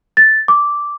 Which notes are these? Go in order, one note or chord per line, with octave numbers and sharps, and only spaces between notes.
A6
D6